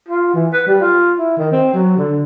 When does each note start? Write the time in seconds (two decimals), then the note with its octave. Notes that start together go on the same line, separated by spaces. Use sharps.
0.09 F4
0.34 E3
0.53 B4
0.67 G3
0.81 F4
1.19 E4
1.37 D#3
1.52 C4
1.74 F#3
1.97 D3